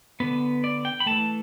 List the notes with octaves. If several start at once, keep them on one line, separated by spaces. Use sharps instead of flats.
D3 B3 B4
D5
G5
B5
E3 A3 A5